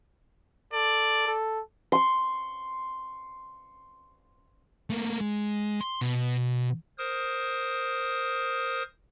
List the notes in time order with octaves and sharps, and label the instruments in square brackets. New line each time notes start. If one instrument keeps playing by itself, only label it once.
[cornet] A4 [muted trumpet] D5
[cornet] A4
[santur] C6 C#6
[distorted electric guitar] A3 A#3
G#3
C6
B2
[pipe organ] A#4 C5 D#6